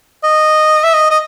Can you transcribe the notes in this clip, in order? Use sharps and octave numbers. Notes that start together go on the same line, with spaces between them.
D#5
E5
D#5
D#5